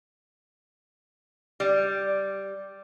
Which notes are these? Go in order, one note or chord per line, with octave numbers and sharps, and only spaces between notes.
G3